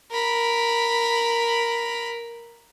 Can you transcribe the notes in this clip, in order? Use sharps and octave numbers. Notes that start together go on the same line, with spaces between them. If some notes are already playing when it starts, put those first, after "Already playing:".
A#4 B5